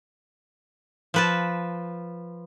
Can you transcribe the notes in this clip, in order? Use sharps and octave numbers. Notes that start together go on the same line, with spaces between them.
F3 B4 A5